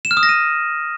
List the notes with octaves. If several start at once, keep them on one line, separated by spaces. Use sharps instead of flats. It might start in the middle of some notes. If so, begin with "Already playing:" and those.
E7
F6
D#6
A#6
D#7